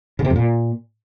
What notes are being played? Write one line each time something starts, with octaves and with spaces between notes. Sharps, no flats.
C#3
C3
F2
A#2